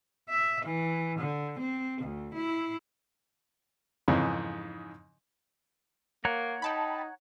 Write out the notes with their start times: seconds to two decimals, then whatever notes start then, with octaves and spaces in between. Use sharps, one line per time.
0.29 E5
0.65 E3
1.18 D3
1.58 C4
2.01 D2
2.33 E4
4.08 F2 G#2 C#3 E3
6.25 A#3 C#5 F#5 A#5
6.62 D#4 G5 A5 B5